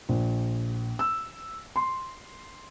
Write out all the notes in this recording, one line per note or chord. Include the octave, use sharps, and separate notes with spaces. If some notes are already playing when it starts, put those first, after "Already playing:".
A#1
E6
C6